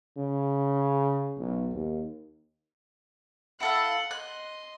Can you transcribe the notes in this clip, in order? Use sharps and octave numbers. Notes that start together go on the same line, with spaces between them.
C#3
B1
D#2
E4 A4 F5 F#5
D#5 C6 F#6